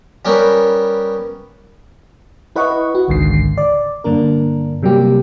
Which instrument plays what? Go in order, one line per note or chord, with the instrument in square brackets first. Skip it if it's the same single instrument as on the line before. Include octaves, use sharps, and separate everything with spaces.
[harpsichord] G3 B3 C#4 G4 A#4
[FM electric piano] E4 B4 D#5 F#5 C#6
F#4
G#1 C#2 G#2 D3 D#3 C7
D5
G2 D3 A#3 D4 A#4
C3 F#3 G3 A#3 G4